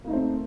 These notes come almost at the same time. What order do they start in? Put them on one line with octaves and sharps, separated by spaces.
A#3 D#4 A3 C4